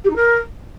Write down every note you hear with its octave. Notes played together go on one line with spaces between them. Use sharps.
G4
D#4
A#4